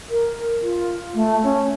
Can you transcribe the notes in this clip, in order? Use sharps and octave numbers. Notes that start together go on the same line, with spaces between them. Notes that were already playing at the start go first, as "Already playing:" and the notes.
A#4
F4
A3
C#4